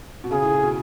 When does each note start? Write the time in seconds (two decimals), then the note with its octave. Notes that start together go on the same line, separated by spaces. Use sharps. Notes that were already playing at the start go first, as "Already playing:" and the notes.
0.24 B2
0.31 C#3 G#4
0.42 A2
0.53 A2
0.63 B2